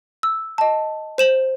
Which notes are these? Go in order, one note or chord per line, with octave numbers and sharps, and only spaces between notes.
E6
D#5 A5
C5 E7 F#7